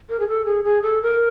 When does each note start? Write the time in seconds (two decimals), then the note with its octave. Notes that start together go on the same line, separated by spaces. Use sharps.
0.09 A#4
0.20 G#4
0.28 A4
0.46 G#4
0.64 G#4
0.83 A4
1.02 A#4